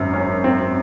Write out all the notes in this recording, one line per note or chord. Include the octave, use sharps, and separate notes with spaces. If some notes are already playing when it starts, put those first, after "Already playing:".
Already playing: G#1 F#2
C#4
C4